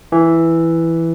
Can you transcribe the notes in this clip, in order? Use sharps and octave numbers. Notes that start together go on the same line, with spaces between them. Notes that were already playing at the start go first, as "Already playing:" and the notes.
E3